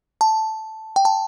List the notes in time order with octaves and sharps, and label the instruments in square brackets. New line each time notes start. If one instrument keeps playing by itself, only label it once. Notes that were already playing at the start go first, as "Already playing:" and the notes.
[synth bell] A5
G5
A5